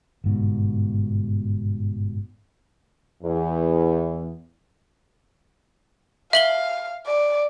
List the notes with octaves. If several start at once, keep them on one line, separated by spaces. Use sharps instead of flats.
G1 G#2 B2
E2
E5 F5 F#7 G7
D5